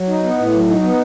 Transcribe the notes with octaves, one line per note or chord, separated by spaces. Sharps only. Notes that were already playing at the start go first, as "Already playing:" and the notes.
Already playing: F#3
D#4
B3
A2
F#3
D#4
B3